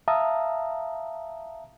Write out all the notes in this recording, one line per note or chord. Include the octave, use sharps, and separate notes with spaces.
E5 F5 A5 A#5 D#6